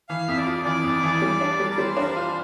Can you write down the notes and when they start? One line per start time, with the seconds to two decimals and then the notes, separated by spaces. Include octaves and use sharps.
0.09 E3 F5
0.28 F2 E5
0.38 D5
0.46 F4
0.65 E3 D5
0.84 F2
1.03 E3
1.22 G3
1.40 D4
1.60 G3
1.71 A#4
1.78 G3 C5
1.97 D4 A#4
2.07 C5
2.16 F4